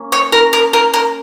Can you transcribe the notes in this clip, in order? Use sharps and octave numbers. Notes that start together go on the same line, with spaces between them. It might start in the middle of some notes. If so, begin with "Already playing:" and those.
Already playing: A#3 C#4
C#5
A#4
A#4
A#4
A#4